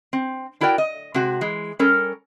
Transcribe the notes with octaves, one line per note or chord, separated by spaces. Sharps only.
C4
D4 E4 F#4 A#4 D5 G5
D#5
C3 G#3 F#4
E3 G#3
G3 C#4 A4 A#4